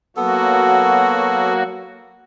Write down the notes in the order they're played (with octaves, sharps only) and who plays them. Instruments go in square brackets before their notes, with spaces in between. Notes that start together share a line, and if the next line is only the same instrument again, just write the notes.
[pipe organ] F#3 A#3 F#4 [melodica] B3 A4